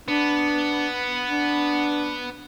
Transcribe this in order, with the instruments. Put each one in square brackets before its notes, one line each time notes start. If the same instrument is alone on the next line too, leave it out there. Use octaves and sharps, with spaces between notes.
[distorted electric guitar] B3 [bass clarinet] D4
[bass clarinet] D4